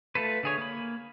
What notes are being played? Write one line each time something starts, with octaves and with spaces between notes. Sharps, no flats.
A3 F4 A4 B4
D3 G#4 C#5
A#3 B5